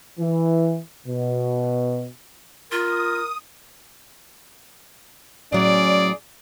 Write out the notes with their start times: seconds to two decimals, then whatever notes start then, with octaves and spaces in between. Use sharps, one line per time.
0.18 E3
1.06 B2
2.72 F4 A#4 D#6
5.53 A2 F#3 C#4 G#4 D5